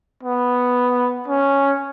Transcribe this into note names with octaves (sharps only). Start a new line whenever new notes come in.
B3
C#4